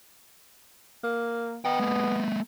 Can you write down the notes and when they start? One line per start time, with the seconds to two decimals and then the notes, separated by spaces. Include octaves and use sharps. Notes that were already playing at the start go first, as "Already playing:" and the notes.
1.03 A#3
1.65 B3 D#5 G5
1.79 G#3 A#3